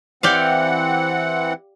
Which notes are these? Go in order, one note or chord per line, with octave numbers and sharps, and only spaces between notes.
E3 C4 G4 D5 F5 F#5